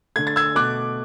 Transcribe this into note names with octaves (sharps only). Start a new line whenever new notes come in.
D3 A3 G#6
A6
E6 G#6
B2 A3 D6 F#6